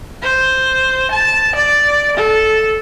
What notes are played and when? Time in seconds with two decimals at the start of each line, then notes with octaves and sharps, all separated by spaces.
0.22 C5
1.11 A5
1.55 D5
2.17 A4